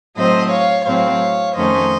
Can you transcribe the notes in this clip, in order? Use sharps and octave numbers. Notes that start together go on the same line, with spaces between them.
A2 F#3 C4 C5 D#5
C#5 F5
A2 F#3 C4 C#5 F5
F2 D#3 A3 C#4 C5 D#5